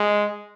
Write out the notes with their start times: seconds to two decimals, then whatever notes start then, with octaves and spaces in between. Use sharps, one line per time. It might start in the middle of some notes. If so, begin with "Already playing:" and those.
Already playing: G#3